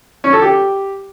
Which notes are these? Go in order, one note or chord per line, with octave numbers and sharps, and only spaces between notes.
C#4
A4
G4